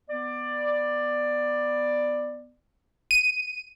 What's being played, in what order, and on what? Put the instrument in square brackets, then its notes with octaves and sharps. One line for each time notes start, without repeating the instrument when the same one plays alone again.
[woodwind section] B3 D5
[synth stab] D#7